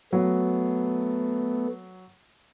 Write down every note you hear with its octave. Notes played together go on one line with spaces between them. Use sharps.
F#3 A3 B3